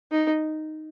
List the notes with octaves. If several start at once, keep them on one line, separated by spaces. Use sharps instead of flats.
D#4